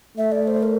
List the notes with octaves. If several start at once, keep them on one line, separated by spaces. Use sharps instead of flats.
A3 E5
D5
C5
A#4